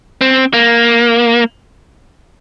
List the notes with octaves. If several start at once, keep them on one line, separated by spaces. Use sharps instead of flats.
C4
A#3